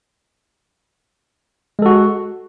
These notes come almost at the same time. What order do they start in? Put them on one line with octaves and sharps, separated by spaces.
G#3 A4 F#4